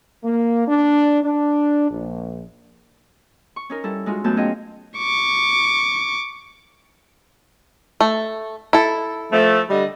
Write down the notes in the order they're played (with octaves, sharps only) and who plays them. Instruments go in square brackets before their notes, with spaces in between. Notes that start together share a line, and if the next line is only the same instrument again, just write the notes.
[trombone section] A#3
D4
D4
A#1
[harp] C#6
C#4 D#4 A#4
G3 E4 A4
G#3 D#4 F4 F#4
F#2 A3 B3 D#4 A5 G6
C#4 F4 G#4 D#5 F5 G5
[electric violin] C#6 D6
[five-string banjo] A3
E4 A4
[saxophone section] F3 A3
D3 G3 D#5